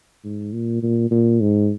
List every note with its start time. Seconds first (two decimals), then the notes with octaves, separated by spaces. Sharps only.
0.24 G#2
0.53 A#2
0.82 A#2
1.11 A#2
1.41 G#2